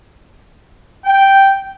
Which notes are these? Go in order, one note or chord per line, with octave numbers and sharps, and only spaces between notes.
G5